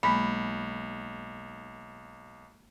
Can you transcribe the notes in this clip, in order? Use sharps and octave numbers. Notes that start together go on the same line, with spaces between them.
B1 G#3 A#3 B5